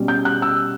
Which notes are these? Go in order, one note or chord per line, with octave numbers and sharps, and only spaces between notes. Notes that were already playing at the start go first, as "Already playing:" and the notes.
Already playing: B2 G3 C#4
G6
F#6
E6